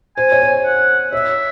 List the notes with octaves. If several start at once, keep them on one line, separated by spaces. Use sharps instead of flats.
C5 G#5
C#5
C5
F#5
C#5 E5